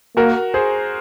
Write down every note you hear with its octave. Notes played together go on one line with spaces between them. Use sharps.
A#3 F#4 A#4
G#4 C5